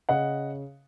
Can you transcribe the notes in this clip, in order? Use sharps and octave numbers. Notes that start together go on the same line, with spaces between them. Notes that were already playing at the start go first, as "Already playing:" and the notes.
C#3 D#5 F#5